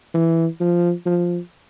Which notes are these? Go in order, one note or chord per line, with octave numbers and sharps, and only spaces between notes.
E3
F3
F3